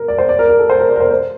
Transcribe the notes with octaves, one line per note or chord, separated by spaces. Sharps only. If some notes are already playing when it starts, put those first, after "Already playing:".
Already playing: A#4
D5
C5
D5
A#4
A#4
A4
C5
A#4
D5
A#4
C5
C5